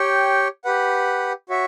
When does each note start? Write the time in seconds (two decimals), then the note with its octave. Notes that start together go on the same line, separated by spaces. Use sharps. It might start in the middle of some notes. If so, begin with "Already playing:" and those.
Already playing: G4 C#5 G5
0.65 G4 B4 F#5
1.49 F#4 C#5 E5